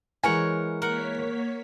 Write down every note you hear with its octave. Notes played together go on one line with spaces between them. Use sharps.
E3 G#3 A#4 C#5 F#5 G#5
A#3 A#4 C#5 F#5 B6